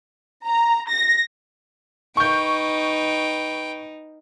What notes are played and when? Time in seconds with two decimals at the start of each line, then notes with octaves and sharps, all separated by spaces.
0.47 A#5
0.91 A#6
2.17 D#4 B4 G5 C#6 G6